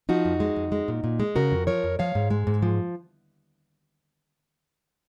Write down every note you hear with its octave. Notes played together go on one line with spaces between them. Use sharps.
F3 D#4 F#4
F2
G#3
F2
G#3
A#2
A#2
G#3
C#3 F#4 A#4
F2
F3 A#4 C#5
F2
F3 C#5 F5
G#2
G#3
G#2
F3